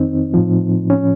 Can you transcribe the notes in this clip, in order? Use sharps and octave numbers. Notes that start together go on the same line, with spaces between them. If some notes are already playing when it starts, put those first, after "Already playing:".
Already playing: F2 D#3 C4 D#4
A2 F3
C#4